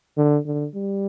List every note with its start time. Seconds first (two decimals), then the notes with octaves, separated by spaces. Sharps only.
0.17 D3
0.46 D3
0.75 G3